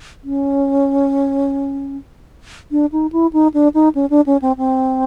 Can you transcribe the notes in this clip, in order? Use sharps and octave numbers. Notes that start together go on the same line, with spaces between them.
C#4
D4
D#4
E4
D#4
D4
D#4
C#4
D4
C#4
C4
C4